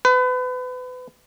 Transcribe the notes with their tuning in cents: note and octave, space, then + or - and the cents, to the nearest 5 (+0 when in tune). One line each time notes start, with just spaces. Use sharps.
B4 +35